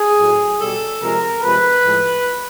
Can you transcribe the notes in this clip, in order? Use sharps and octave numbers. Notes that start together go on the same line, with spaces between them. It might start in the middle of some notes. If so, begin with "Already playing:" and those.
Already playing: G#4
A2 F#3 A3
B2 G3 A4
C3 F3 G#3 A#4
C3 F3 G#3 B4
A2 F3 G#3